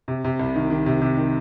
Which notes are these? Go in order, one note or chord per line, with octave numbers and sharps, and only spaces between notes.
C3
C3
C2
D#3
D#3
C3
C3
D#3